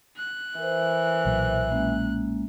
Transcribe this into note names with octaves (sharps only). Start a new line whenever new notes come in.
F#6
E3 A#4 C5
B1 A#2 F#3
G#3 A#3 C#4